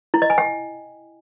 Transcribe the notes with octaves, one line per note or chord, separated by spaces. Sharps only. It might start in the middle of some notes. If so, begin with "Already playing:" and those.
E4
D#5
G#5
G5